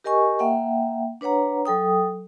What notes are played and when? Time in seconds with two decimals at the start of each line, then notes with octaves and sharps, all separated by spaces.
0.04 G4 A#4 D#5 G#5 C#6
0.39 A#3 E5 F#5 G5
1.21 D4 B4 C#5 F#5 A#5
1.65 F#3 A4 G5 D#6